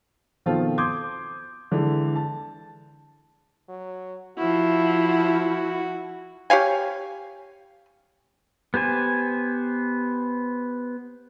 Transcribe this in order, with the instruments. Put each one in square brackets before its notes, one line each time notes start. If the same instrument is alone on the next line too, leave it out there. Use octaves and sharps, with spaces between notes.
[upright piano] B2 D#3 F3 C4 F4 A4
C6 D6 D#6 G6 G#6
D3 E3 G#3
A5
[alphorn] F#3
[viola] F3 E4 [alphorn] F#4
[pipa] G4 C#5 F5 G#5
[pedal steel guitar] B3 G4 C5 G#5